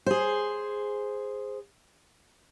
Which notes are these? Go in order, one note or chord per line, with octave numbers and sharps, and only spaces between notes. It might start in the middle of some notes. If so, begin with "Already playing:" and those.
G#4 C5